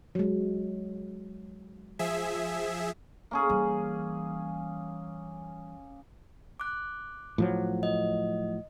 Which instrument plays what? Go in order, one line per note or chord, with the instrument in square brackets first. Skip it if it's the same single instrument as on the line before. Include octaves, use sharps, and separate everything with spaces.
[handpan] F#3 G#3
[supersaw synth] F3 G#4 E5
[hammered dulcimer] A#3 C#4 G#4
[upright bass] E3 G3
[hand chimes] D6 F#6
[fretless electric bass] A2 F3 F#3
[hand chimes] D#5